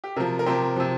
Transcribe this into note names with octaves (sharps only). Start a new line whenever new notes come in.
G4
C3 F3 A#4
A#4
C3 F3 G4 C5
C3 F3